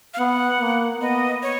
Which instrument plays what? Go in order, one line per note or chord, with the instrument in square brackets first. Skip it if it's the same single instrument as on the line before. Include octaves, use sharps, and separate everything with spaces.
[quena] F5
[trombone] B3 [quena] F#5
[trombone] A#3
[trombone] B3 [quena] D#5
[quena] C#5